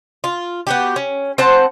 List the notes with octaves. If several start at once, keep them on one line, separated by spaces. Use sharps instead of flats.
F4
B3 F#4 G4
C#4
C4 C5 F#5 A5